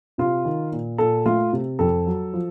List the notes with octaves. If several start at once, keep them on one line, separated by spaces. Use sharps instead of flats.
C3 F4
D#3
A#2
A#2 A4
A3 F4
C3
F2 A4
F#3
F3